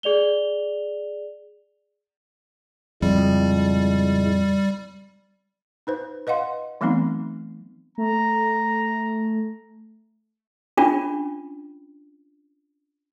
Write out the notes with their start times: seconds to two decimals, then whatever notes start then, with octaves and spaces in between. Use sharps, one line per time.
0.03 G#4 D5 F7 G7
3.02 F2 A2 C#3 G3 G#3
5.87 D#4 B4 C5
6.27 B4 D#5 F5 F#5 C6
6.81 E3 F#3 A3 B3 C4 D#4
7.98 A3 A#5
10.77 C#4 D4 F4